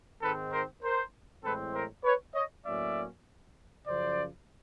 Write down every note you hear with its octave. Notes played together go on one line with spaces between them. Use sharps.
G#2 D#3 G#3 C4 A4 B4
A#4 C5
A#4 C5
A2 E3 G#3 C4 A4 B4
A#4 C5
B4 C#5
C#5 D#5
A2 F#3 A#3 C#4 D5 E5
F#2 C#3 F3 C5 D5